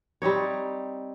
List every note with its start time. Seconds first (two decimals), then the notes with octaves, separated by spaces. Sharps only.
0.22 G3 C4 D#4 C#5